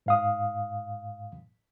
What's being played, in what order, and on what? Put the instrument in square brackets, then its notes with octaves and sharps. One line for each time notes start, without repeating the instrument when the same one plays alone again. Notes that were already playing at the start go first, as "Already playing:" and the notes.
[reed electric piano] G#2 F5 D#6